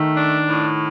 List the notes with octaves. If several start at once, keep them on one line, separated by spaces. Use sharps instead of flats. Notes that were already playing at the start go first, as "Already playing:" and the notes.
Already playing: D#3 A3
D4
A2